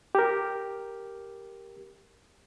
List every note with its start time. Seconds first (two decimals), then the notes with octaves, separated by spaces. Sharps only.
0.15 G4 A#4